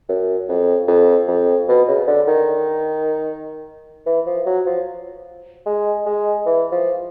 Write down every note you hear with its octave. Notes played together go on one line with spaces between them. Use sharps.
F#2
F2
F2
F2
B2
C#3
D3
D#3
E3
F3
F#3
F3
G#3
G#3
E3
F3